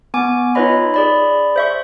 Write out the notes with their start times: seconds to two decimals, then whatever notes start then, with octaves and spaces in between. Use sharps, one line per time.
0.14 B3 G#5 D6
0.55 D#4 F4 B4 C#5 D#5 B5
0.94 G#4 D5 B5
1.56 C5 E5 C#6